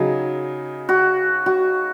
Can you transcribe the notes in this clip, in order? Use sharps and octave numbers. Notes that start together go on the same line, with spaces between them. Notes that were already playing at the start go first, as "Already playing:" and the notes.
Already playing: C#3 F#3 D#4 G#4
F#4
F#4